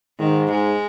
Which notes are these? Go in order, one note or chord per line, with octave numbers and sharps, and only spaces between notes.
G#2 D#3
G#3